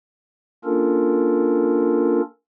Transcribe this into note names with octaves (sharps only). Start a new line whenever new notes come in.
A#3 C#4 D4 F4 A4 A#4